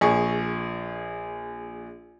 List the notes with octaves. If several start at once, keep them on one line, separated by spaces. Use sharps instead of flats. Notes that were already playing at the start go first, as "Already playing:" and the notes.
A#1 G#4 C#6